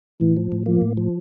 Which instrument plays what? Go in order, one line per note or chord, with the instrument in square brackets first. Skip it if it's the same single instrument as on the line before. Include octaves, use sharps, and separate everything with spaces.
[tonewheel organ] A2 [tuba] E3
[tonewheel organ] F3
A2
[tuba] F3 [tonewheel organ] A#3
[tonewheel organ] A2
F3